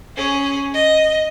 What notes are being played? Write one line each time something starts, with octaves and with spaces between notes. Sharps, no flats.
C#4 G#4
D#5